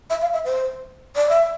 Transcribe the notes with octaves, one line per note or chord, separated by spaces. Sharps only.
E5
F5
E5
C5
D5
E5